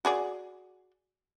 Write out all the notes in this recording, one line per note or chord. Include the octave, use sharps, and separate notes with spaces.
F#4 G#4 D5